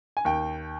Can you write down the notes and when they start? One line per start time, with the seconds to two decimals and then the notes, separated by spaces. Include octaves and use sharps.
0.17 G#5
0.25 D#2 G5